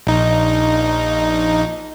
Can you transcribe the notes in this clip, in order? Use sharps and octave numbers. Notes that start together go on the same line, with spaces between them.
A#1 D#4